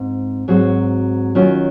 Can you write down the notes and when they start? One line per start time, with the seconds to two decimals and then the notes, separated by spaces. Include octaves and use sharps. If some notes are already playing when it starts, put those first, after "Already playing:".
Already playing: G#2 C4
0.48 G#2 F#3 C4 F#4
1.35 D#3 F#3 C#4 F4